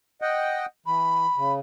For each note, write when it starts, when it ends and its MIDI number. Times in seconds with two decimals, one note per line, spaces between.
0.22 0.66 75
0.22 0.66 78
0.22 0.66 79
0.86 1.26 52
0.86 1.54 83
1.36 1.59 49